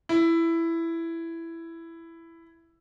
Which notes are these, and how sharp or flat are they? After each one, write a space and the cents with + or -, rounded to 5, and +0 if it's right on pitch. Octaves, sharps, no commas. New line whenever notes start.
E4 +10